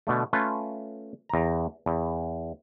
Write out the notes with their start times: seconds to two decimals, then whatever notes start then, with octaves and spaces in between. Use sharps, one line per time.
0.07 B2 D3 A3
0.33 A3 C#4 F4 B4
1.29 E2 A#5
1.86 E2